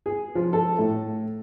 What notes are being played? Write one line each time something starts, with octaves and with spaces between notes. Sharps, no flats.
G#4
F3
A4
A2